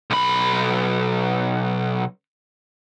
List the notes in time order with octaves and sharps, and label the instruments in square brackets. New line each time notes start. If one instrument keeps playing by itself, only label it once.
[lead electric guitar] B1 B5